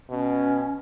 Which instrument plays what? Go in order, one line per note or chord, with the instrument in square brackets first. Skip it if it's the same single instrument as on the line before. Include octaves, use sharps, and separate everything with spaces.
[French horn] B2 [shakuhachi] C#4